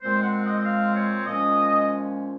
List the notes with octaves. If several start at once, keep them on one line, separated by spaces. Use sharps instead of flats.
A#2 G#3 C4 C5
F#5
D#5
D#5
F5
C#5
A#2 F3 G#3 C#4 D#5